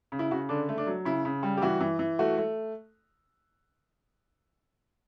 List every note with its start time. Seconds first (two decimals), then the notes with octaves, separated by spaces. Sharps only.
0.12 C#3
0.19 E4
0.31 C#3 F#4
0.49 D3 D4
0.69 A3
0.78 D4
0.87 F#3
1.05 C#3 E4
1.25 C#3
1.43 G3
1.57 G4
1.62 E3 F#4
1.81 E3
1.99 E3
2.19 A3 F#4
2.38 A3